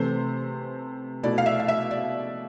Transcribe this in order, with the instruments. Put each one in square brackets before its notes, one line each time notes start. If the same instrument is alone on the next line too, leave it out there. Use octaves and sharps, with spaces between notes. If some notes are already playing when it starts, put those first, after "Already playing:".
Already playing: [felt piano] C3 E3 A3 C4 C5
B2 A3 E4 D5
F5
E5
F5
E5
D5